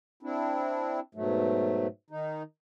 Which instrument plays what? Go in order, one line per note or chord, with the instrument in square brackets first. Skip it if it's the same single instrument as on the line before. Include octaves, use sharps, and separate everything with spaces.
[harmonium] C4 D4 E4
G#2 B2 F#3 A3
D#3 D#4